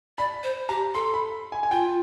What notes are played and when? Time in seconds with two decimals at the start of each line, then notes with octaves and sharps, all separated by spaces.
0.18 D5 B5
0.43 C5
0.69 G4 A#5
0.95 A4 C6
1.14 B5
1.52 G#5
1.63 G#5
1.71 F4 G5